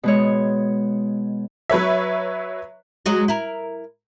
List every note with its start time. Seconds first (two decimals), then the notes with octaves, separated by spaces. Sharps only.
0.03 B2 G#3 C#5
1.70 F#3 B4 C#5 E5
3.06 F#3 G#3 F#4
3.28 E4 A#4